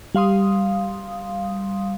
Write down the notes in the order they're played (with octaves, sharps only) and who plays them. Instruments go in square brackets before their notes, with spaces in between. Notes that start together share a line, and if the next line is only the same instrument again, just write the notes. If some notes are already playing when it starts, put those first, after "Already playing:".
[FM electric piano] G3 F5 C6 D#6